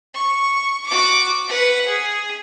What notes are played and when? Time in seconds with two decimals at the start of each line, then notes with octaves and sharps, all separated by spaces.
0.14 C#6
0.86 F#4 D6
1.47 B4 F#5
1.87 G#4